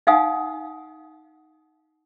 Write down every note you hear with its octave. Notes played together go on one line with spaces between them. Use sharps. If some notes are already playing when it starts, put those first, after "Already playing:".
D#4 F5 F#5 G#5 D#6